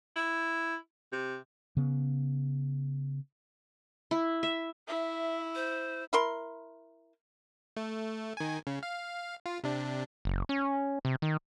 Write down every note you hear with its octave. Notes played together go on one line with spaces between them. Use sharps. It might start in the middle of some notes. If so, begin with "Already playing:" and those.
E4
C3
C#3 B3
E4
E5
E4 E5
C5
E4 A#4 C6
A3
D#3 G#5
C#3
F5
F4
C3 D4
F#1
C#4
C3
D#3